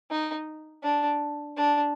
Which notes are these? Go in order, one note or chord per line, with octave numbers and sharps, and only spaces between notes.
D#4
D4
D4